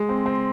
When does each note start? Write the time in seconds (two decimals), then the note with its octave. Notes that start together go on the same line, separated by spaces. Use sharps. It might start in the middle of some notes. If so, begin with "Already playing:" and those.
Already playing: G#3
0.09 C4
0.26 C4